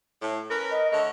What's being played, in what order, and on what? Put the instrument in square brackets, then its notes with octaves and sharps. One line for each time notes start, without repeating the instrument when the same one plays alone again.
[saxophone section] A2
[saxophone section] C#4 B4 [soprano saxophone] A#4
[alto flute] D#5
[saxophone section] D3 A3 C#5 [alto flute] D#5